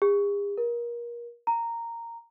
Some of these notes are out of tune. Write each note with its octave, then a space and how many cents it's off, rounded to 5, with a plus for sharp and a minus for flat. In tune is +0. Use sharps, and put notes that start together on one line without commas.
G#4 -45
A#4 +30
A#5 -10